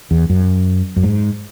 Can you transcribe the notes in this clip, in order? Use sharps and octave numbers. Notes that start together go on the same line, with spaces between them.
E2
F#2
F#2
G#2